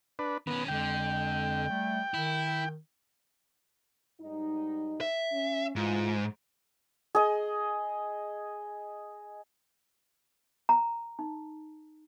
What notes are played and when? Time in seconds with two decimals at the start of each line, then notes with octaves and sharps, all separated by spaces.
0.19 D4 B4
0.47 D#3 B3 C#4
0.68 F2 D3 G#3 G5
1.69 G3 A3
2.14 D#3 E4
4.21 G#2 G3 D#4
5.01 E5
5.32 C#4
5.76 G#2 E3 A3 F4
7.15 G#4 D#5
10.69 A#5
11.19 D#4